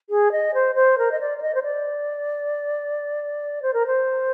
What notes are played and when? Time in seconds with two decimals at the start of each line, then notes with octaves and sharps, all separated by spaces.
0.09 G#4
0.32 D#5
0.54 C5
0.75 C5
0.98 A#4
1.11 D#5
1.20 D5
1.38 D5
1.42 D#5
1.54 C5
1.63 D5
3.62 C5
3.73 A#4
3.87 C5